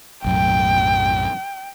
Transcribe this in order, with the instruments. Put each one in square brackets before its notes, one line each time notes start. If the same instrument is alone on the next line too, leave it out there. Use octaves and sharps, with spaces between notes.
[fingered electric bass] B1 F#2 A2 [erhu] G5